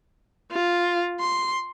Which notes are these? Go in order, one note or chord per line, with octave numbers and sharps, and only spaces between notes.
F4
C6